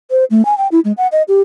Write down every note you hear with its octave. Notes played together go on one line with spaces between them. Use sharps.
C5
A3
G#5
G5
E4
G#3
F#5
D#5
G4